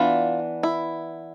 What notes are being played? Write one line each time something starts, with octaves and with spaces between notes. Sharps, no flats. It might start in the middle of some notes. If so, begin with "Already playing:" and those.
Already playing: E3 B3 D4 F4
E4